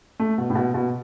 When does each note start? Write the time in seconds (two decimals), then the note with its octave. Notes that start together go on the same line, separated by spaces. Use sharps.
0.19 A3
0.38 B2
0.50 A2
0.55 B2
0.74 B2